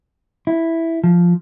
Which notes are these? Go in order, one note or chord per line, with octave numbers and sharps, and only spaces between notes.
E4
F3